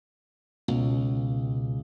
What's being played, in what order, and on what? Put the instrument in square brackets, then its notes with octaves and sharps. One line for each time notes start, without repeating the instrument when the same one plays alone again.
[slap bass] C#2 [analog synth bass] B2